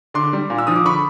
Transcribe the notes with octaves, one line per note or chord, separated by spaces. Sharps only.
D3 C6 D6
G3
A#2
E6
F3 D#6
D6
D3 B5 C#6